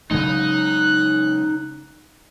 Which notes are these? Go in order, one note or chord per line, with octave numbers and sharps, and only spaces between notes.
C#3 F#3 G#3 D#4 F#6